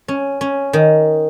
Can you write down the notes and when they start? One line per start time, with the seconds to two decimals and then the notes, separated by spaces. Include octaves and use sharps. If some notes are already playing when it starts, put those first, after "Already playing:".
0.08 C#4
0.41 C#4
0.73 D#3